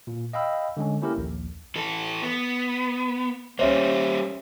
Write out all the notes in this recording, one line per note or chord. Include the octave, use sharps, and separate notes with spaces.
A#2
D#5 F5 G5 B5 E6
D3 G#3 C#4
A#3 C#4 E4 G4 A4 A#4
A#1 D#2
E3 A4
B3
G3 A#3 C#4 C5 C#5 E5